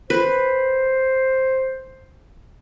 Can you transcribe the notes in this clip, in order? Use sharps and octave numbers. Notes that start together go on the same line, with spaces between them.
B4 C5